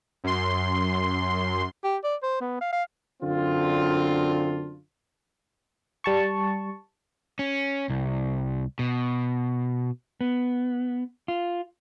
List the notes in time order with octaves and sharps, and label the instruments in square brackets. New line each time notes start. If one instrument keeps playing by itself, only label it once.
[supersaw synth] F#2 C6
[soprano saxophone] G4
D5
C5
B3
F5
F5
[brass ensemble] F#2 D3 C4 D4 F4
[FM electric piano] G3 A5 C#6
[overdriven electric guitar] C#4
C2
B2
[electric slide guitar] B3
F4